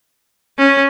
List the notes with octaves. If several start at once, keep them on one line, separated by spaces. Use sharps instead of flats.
C#4